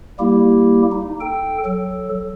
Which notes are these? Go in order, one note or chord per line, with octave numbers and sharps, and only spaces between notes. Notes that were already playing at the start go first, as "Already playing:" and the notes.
G3 A#3 E4 G4
D#4
A4 G5
F#3 A4